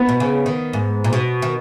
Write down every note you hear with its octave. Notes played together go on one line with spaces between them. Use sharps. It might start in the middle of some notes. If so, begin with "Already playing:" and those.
Already playing: B3
B2
C#3
D#3
G#2
A#2
B2
D#3